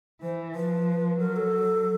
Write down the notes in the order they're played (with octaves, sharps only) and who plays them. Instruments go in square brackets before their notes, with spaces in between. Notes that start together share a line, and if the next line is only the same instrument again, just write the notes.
[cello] E3 [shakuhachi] C5
[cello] F3 [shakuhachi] B4
[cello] F#3 [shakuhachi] A#4
[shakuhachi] A4